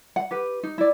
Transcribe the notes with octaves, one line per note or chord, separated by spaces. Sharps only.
F#5
G4 B4
D#4
E4 D5